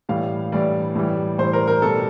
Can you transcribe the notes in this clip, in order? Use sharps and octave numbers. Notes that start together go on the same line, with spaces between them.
A2 E3 G3 F5
A2 E3 G3 D5
A2 E3 G3
A2 E3 G3 C5
A#4
A#4
B2 G3 B3 A4